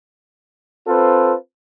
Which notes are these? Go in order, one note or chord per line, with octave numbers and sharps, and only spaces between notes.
C4 F4 A4 B4 C5